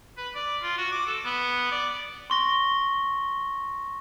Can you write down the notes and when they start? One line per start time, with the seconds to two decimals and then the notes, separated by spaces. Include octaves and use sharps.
0.17 B4
0.35 D5
0.63 F4
0.78 F#4
0.92 D6
1.07 A4
1.25 B3
1.71 D5
2.30 C6 C#6 A#6